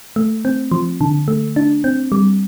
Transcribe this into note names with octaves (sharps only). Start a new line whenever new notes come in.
A3
C4
F3
D3
A3
D4
C4
G3